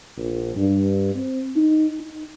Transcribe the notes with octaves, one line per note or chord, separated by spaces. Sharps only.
A#1
G2
C4
D#4
D#4